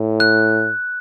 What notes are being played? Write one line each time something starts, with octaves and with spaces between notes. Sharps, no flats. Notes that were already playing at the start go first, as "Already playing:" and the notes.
Already playing: A2
F#6